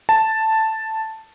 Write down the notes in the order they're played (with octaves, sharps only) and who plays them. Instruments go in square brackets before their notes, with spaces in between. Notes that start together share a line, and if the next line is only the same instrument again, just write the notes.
[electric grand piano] A5